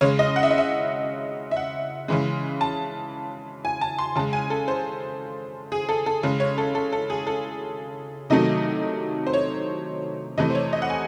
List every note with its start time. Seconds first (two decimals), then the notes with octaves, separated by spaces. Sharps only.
0.01 C#3 G#3 C#5
0.19 D#5
0.36 F#5
0.43 E5
0.50 D#5
0.58 E5
1.51 E5
1.57 F#5
2.08 C#3 E3 G#3
2.61 A5
3.65 G#5
3.81 A5
3.99 C6
4.16 C#3 A5
4.19 G#3
4.33 G#5
4.50 A4
4.68 C5
5.72 G#4
5.89 A4
6.06 A4
6.23 C#3 G#3
6.40 C#5
6.58 A4
6.75 A4
6.92 A4
7.10 G#4
7.27 A4
8.30 C3 D#3 F#3 A3 D#5
9.27 C5
9.33 C#5
10.38 C3 E3 A3 D#5
10.50 C5
10.55 C#5
10.73 D#5
10.82 F#5
10.90 G#5